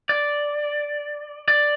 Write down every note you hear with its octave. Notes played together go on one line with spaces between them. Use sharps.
D5
D5